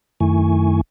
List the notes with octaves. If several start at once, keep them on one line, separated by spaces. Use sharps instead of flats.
F#2 D#3 A3 E4 G#5 C#6